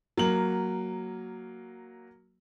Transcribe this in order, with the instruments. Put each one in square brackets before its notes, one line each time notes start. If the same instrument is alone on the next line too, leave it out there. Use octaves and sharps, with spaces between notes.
[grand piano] F#3 A#3 F#7